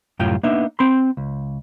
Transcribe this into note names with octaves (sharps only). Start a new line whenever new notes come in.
C2 F#2 A2 F4 G5
A#3 B3 D4 D#4 E5
C4 B5 C6
C#2